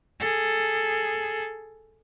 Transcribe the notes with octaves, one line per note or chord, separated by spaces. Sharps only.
G#4 A4